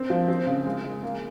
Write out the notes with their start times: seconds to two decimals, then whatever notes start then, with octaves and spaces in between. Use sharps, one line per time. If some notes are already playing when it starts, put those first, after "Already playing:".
Already playing: C4
0.10 F3
0.28 C4
0.47 C#3
0.65 G#3
0.84 G#3
1.03 A#3